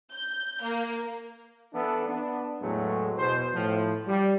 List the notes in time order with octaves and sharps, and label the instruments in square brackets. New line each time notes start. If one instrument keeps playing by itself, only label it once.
[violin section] G6
A#3
[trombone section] E3 B3 D4 E4 A4
B3 D4
E2 A2 F#3 G#3 A3
E2 B2 C5
A2 F3
G3